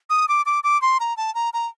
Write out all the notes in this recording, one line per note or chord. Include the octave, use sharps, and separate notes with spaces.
D#6
D6
D6
D6
C6
A#5
A5
A#5
A#5